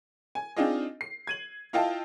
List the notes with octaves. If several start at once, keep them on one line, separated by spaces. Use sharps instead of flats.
G#5
C4 D4 D#4 F4 G#4 D#5
C7
G#6 D#7 F#7
E4 F4 D#5 F5 G5 A5